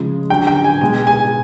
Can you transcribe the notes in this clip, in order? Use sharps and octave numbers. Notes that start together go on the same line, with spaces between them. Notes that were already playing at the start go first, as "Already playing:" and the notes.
Already playing: C#3 F3 G#3
D3 F#3 G5
G5
G#5
B2 G#3 G#5
G#5